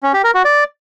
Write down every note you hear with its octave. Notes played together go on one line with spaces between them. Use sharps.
C#4
G4
A#4
F#4
D5